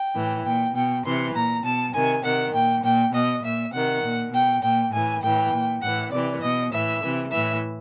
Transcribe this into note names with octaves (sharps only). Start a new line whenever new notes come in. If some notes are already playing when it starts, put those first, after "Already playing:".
Already playing: G5
A2 E3
A#2 G5
B2 G5
C3 E3 C6
A#2 A#5
B2 A5
C3 D#3 G#5
C3 D#3 F#5
A#2 G5
A#2 G5
B2 D#5
A#2 E5
C3 D#3 F#5
A#2
B2 G5
A#2 G5
A2 E3 G#5
A2 E3 G5
A#2
A2 E3 F#5
C3 E3 D5
B2 D#5
A2 E3 E5
C3 E3
A2 E3 E5